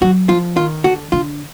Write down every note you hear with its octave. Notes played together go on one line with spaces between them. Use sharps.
F#3 F#4
F3 F4
D#3 F4
D3 F#4
D3 F4